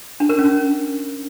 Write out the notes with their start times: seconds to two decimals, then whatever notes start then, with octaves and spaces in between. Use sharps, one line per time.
0.20 D4
0.29 A#4
0.39 C#4